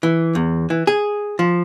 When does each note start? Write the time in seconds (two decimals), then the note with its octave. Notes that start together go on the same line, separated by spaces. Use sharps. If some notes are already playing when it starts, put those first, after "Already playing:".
0.03 E3
0.35 E2
0.70 E3
0.87 G#4
1.39 F3